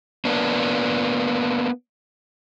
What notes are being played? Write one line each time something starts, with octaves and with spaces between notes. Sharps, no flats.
A#3 B3 D4